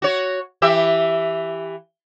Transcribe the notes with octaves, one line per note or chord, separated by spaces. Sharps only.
F#4 C#5
E3 G4 E5